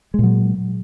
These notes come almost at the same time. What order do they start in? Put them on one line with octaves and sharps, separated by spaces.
G#3 A#2 F#3